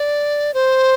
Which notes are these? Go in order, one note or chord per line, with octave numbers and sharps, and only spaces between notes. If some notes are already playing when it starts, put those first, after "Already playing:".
Already playing: D5
C5